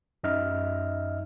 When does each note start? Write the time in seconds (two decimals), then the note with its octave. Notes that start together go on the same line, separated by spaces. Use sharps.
0.24 F#2 D#4 D#5 E5 F6